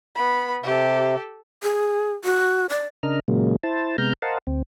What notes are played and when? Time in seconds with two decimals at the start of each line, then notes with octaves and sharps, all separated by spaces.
0.15 B3 B5
0.64 C3 G4 A4
1.63 G#4
2.24 F#4
2.70 D5
3.03 C#3 D4 A#4 D#5 F6
3.28 A#2 C#3 F#3 G#3 A#3
3.63 E4 C5 A5
3.98 C3 G#3 B3 A#5 F6 G6
4.22 A#4 C5 D#5 F5 F#5 A5
4.47 D2 C4